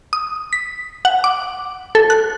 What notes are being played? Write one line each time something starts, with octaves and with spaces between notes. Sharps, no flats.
D#6
B6
F#5
D6
A4
F#6